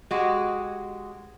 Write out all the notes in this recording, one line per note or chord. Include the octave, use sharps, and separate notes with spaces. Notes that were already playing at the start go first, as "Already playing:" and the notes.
G#3 F#4 G4